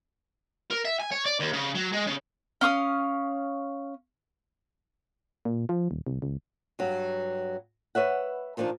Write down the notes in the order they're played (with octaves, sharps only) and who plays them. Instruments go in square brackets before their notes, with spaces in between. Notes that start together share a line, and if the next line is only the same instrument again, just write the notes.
[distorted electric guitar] A#4
E5
G#5
C#5
D5
D#2
C#3
F#3
G#3
C#3
[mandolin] C#4 F5 C#6 D#6
[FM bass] A#2
F3
D#1
C2
C#2
[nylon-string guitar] G2 F#3
B4 C#5 E5 F#5
A#2 D#3 F3 D4 D#4